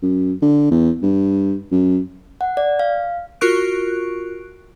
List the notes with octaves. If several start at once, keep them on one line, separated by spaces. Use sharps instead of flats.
F#2
D3
E2
G2
F#2
F#5
D5
F5
F4 F#4 A#4 C#6 F#6 D7